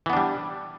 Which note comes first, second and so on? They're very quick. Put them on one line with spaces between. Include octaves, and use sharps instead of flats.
E3 B3 D4 G3